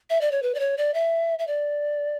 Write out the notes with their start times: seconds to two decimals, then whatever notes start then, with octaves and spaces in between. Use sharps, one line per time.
0.10 E5
0.21 D5
0.31 C#5
0.43 B4
0.55 D5
0.60 C#5
0.78 D5
0.94 E5
1.39 E5
1.47 D5